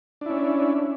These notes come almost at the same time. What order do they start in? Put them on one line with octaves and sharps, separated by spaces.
D4 E4 C#4